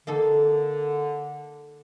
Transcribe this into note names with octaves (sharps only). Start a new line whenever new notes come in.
D3 A#3 D#4 A4